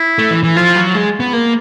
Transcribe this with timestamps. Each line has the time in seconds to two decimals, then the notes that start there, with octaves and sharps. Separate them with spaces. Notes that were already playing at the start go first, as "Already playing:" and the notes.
Already playing: E4
0.18 A3
0.31 E3
0.44 E3
0.56 F3 F4
0.76 F#3
0.95 G#3
1.20 B3
1.33 A#3